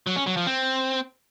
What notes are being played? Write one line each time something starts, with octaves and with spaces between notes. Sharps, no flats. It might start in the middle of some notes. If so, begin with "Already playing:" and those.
F#3
C#4
F#3
F3
C4